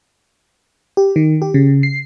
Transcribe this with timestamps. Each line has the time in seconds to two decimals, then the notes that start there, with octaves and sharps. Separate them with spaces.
0.97 G4
1.16 D#3
1.42 G4
1.54 C#3
1.83 C7